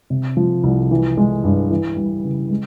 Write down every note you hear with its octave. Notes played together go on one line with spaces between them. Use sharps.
C3
F3
C2
E3
G#3
G2
E3
G3
C#3
G#3